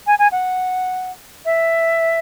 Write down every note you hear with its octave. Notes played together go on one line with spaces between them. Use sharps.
G#5
G#5
F#5
E5